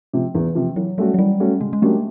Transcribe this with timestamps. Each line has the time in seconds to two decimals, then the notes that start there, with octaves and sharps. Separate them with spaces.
0.13 C3 F3
0.35 E2 E3
0.55 C3 F3
0.76 E3 F#3
0.98 G3 A3 C#4 F#4
1.14 F#3
1.19 E3 G3
1.40 A3 C#4 F#4
1.61 C#3 G#3
1.73 G#3
1.82 F#3 A3 A#3 D4 G4